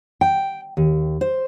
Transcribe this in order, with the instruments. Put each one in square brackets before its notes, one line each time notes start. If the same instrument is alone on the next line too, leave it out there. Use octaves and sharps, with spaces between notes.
[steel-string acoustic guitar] G5
D#2
C5